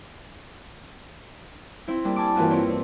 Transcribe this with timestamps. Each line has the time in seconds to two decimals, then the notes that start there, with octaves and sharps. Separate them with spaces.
1.88 C4 E4
2.04 G3 A#3 D4
2.16 G#5 A5 D6
2.36 G2 E3 A#3 C4 F4 F#4
2.50 C4 E4 F4 C#5
2.69 C4